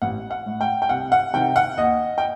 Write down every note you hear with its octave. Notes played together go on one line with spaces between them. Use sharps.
A1 F#5
F#5
A2
G5
G5
C2 F#5
F#5
C3 D#3 G5
F#5
D#2 D#5
G5